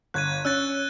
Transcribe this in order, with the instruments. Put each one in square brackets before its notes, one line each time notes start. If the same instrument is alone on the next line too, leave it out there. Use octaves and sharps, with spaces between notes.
[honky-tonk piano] G1 [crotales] F#6 G#6 D#7
[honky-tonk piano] C#4 [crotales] E6 F#6 A6